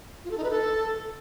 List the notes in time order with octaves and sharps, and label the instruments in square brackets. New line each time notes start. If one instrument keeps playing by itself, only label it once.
[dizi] F4
A4
D#4
B4
A4